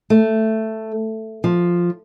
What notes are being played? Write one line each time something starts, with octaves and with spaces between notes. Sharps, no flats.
A3
F3